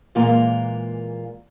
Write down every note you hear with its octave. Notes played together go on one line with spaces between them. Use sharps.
A#2 E3 G#3 A#3 F4 A#5